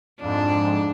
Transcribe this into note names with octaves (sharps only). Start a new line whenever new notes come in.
F2 G#2 D4